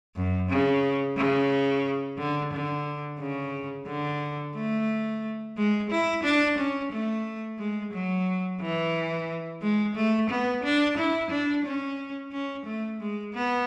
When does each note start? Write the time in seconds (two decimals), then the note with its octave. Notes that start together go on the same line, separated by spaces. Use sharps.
0.16 F#2
0.49 C#3
1.18 C#3
2.18 D3
2.53 D3
3.20 C#3
3.87 D3
4.56 A3
5.57 G#3
5.91 E4
6.24 D4
6.58 C#4
6.93 A3
7.59 G#3
7.94 F#3
8.61 E3
9.62 G#3
9.96 A3
10.30 B3
10.64 D4
10.98 E4
11.31 D4
11.66 C#4
12.32 C#4
12.66 A3
13.00 G#3
13.34 B3